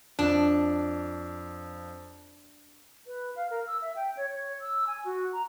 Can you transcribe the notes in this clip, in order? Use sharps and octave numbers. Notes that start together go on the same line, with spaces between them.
F2 D4
B4
F5
A#4
E6
E5
G5
C#5
C#5
E6
G#5
F#4
A#5